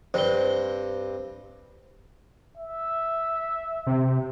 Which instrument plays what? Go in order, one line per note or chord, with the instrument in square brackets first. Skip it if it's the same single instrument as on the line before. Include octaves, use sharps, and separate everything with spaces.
[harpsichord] G2 C4 [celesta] C5 G7
[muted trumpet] E5
[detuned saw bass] C3